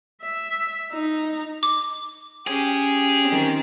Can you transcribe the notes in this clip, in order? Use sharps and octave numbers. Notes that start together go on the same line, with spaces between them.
E5
D#4
D6
C#4 G4 G#4
D#3 C4